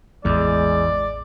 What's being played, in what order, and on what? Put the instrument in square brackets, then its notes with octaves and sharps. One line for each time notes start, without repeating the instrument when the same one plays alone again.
[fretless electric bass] A1 [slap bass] E2 [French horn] G#3 [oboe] D5